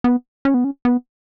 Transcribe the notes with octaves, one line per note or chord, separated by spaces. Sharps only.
B3
C#4
B3
C#4
B3